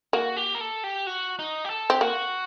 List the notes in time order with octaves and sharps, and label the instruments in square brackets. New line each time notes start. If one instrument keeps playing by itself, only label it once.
[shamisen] A#3 [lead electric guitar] F#4
[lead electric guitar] G4
A#4
A4
G4
F#4
D#4
G4
A4
[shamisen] C4 [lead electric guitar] G4
[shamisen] A#3 [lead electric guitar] F#4